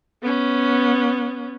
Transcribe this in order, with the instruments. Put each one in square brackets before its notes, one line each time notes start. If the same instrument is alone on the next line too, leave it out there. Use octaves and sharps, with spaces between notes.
[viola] B3 C#4